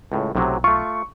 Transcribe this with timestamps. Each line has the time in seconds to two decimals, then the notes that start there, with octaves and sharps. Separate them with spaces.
0.12 C#2 A2
0.35 B1 A2 C3 F#3
0.64 A3 F4 C#6